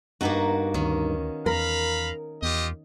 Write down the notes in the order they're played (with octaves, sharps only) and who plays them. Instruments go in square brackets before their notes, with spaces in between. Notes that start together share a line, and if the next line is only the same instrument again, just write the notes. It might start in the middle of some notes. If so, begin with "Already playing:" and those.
[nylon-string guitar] G2 D#4 [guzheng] A#3 B3 F#4
[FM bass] D2 [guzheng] D#3 C#4
[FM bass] E2 [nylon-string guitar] A#4 [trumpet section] F5 A#5 B5
[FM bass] E2 [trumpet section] F4 G4 D#5